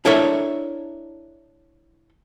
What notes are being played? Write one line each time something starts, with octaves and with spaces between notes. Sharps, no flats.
D4 E4 A4 A#4 C#5 E5